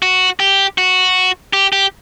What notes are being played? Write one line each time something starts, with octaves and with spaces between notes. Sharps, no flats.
F#4
G4
F#4
G4
G4